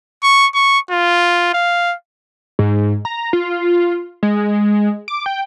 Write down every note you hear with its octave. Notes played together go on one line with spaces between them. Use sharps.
C#6
C#6
F4
F5
G#2
A#5
F4
G#3
D6
G5